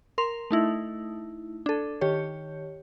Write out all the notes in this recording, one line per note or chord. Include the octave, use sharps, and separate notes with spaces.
A#4 C6 F7
A3 D#4 E4
D4 A4
D#3 G4 C#5